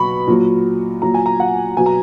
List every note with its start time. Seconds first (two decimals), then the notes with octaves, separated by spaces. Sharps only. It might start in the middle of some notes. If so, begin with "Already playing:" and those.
Already playing: B2 F#3 B5 C#6
0.27 A#2 F#3
1.02 A#2 F#3 A#5
1.14 G#5
1.26 A#5
1.40 F#5
1.77 B2 F#3 G#5
1.86 A#5